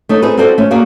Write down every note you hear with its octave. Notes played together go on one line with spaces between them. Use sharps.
A3 D#4 C#5
C4 D#4 G#4 A4 B4
C4 E4 F#4 A4 C5 D5
A3 C#4
A3 A#3 F#4 G#4 D5 F5